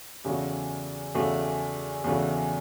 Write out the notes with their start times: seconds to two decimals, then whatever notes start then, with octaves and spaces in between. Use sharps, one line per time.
0.24 E2 C#3 A3 F#4
1.14 E2 C#3 A3 F#4
2.04 E2 C#3 A3 F#4